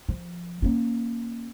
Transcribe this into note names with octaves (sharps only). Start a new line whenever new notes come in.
F3
A#3 C#4